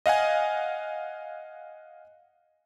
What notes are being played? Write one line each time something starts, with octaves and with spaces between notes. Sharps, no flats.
D#5 F5 F#5 G#5